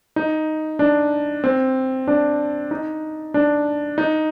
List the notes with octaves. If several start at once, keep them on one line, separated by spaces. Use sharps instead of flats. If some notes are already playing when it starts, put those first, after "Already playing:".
D#4
D4
C4
D4
D#4
D4
D#4